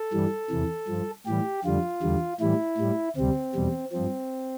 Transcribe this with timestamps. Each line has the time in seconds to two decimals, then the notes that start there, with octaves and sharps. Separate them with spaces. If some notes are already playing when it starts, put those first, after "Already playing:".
Already playing: A4
0.13 G2 E3 G3
0.50 E2 C3 E3
0.88 G2 F3
1.26 A2 E3 G3 G4
1.65 F2 D3 G3 F4
2.03 E2 D3 G3
2.41 A2 E3 G3 E4
2.78 A2 G3
3.17 D2 C3 G3 C4
3.55 E2 B2 G3
3.92 G2 F3 C4